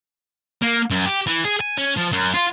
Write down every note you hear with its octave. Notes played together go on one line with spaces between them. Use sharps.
A#3
F#2
G4
E3
G#4
G#5
C#4
F3
F#2
F4